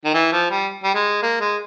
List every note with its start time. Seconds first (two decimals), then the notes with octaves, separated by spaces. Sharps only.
0.05 D#3
0.14 E3
0.32 F3
0.50 G3
0.84 G3
0.95 G#3
1.22 A#3
1.41 G#3